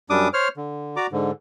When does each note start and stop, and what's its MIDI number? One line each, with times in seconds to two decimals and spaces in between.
0.10 0.28 42
0.10 0.28 55
0.10 0.28 62
0.10 0.28 86
0.10 0.28 87
0.33 0.48 72
0.33 0.48 73
0.33 0.48 89
0.57 0.96 50
0.96 1.07 66
0.96 1.07 74
0.96 1.07 82
0.96 1.07 86
1.12 1.31 44
1.12 1.31 50